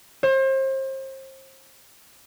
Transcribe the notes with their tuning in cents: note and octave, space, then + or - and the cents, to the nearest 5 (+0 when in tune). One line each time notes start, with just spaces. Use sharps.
C5 +35